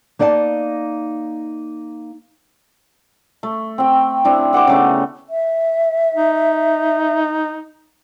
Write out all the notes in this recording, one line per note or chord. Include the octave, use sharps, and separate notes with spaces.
A#3 D#4 D5 D#5 F#5 A5
A3
C4 G5
C4 D4 E4
G4 F#5 C6 D6
C#3 A3 B3
E5
D#4